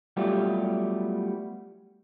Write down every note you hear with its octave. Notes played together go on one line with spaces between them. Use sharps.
F#3 G3 A3 B3 F4 G4